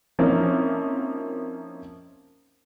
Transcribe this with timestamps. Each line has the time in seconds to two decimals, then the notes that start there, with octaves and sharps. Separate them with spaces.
0.19 F3 A#3 C4 C#4 D#4 E4